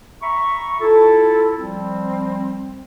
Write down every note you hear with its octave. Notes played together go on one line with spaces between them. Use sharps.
E5 A#5 B5 C#6
E4 F4 A4
F3 G3 C4